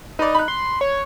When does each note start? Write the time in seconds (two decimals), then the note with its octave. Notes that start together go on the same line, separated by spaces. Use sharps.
0.19 D#4 B4 D5
0.35 B5 F#6
0.48 C6
0.81 C#5